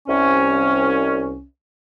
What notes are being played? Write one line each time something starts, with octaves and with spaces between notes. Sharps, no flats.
C2 C#4